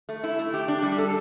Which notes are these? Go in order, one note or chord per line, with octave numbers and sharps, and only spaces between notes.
A3
E4
A3
G4
D4
G3
A4